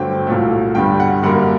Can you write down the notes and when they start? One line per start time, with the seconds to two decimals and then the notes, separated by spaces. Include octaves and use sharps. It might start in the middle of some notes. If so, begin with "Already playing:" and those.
Already playing: G2 D3 F#3 A3 C4 G5
0.27 C2 A#2 F#3 A3
0.75 G2 D3 G3 G5
1.00 F#5
1.23 F#2 D3 G3 A#3 F#5